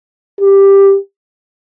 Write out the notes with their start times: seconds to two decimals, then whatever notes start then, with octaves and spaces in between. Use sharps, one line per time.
0.41 G4